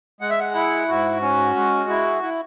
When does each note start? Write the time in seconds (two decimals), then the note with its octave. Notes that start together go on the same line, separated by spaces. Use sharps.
0.21 G#3 F#5
0.30 E5
0.40 F#5
0.54 E4
0.88 G#2 F#4
1.22 C#4
1.56 G#3
1.90 E4
2.23 E4